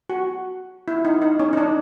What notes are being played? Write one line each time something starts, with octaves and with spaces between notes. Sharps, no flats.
F#4
E4
D#4
D#4
C#4
D#4
D4